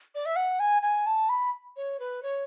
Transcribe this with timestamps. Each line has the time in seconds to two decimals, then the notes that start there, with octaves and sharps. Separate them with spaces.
0.15 D5
0.26 E5
0.36 F#5
0.59 G#5
0.82 G#5
1.06 A5
1.29 B5
1.76 C#5
1.99 B4
2.23 C#5